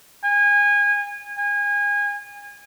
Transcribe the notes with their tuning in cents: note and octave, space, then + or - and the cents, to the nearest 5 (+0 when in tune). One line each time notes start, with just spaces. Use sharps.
G#5 -25
G#5 -25